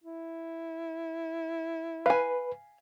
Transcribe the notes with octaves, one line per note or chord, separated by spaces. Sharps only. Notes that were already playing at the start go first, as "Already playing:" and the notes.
E4
B4 F5 G#5